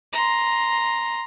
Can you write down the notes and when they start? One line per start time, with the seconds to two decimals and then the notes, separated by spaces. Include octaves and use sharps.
0.13 A#5 C6